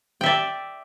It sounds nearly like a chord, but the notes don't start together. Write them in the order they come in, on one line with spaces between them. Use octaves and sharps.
G5 E5 D5